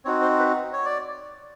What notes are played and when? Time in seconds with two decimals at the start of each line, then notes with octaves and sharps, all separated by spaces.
0.05 C4 D#4 F#4 C#5
0.22 C5
0.39 B4
0.73 C#5
0.85 D5